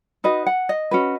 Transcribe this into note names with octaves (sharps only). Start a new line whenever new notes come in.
D#4 F#4 B4 D#5
F#5
D#5
C#4 F#4 B4